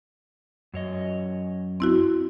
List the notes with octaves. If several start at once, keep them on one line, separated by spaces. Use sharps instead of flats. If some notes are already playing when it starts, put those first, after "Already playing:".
F#2 C#5 D#5
C4 E4 F#4